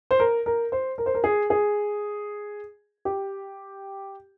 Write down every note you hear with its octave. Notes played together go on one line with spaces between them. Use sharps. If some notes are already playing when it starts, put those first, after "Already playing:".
C5
A#4
A#4
C5
A#4
C5
A#4
G#4
G#4
G4